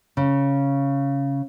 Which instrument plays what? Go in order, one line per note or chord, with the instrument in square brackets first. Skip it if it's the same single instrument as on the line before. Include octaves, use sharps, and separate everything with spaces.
[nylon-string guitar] C#3